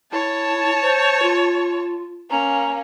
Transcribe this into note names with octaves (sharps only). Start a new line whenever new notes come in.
E4 C#5 A5
C5
F4
A#3 C#4 A#5